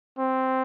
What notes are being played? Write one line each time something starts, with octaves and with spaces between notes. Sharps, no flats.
C4